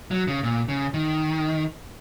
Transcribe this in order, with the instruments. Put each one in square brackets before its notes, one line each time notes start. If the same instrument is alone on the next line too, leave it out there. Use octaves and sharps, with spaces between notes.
[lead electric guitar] F#3
C#3
A#2
C#3
D#3